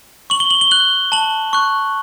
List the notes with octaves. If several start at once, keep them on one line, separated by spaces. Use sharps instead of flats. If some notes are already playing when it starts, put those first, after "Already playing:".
C#6 F#7
G7
F#7
G7
F#6 F#7
A5 F#7
C#6 F#6